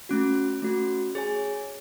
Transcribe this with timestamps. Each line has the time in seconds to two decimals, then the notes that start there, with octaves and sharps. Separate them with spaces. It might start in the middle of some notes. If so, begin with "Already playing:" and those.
0.09 A3 C#4 F#4
0.62 A3 C#4 F#4
1.15 G#4 C#5 G#5